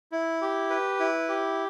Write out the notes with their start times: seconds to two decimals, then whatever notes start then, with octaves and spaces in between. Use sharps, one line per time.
0.12 E4
0.41 G4
0.70 B4
1.00 E4
1.28 G4